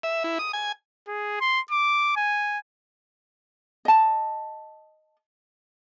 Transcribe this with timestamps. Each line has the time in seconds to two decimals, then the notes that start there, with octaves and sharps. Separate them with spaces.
0.03 E5
0.24 E4
0.39 D#6
0.53 G#5
1.08 G#4
1.41 C6
1.71 D6
2.16 G#5
3.85 D#5 A5